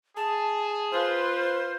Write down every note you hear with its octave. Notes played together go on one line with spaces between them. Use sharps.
G#4 A5
F4 B4 C5